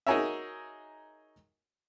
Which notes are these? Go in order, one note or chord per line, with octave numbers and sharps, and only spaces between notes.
D#4 F#4 G#4 A#4 C#5 E5